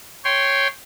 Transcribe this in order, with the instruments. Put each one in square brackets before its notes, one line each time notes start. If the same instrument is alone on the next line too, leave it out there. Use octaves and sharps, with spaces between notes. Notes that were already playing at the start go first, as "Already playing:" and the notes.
[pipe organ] C#5 G5 C6